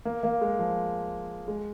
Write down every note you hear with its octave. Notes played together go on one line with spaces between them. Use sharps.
A#3
A#3
G#3
F3
G#3